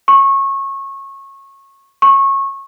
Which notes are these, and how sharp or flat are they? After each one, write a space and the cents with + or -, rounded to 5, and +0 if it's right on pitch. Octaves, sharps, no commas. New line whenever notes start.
C#6 -20
C#6 -20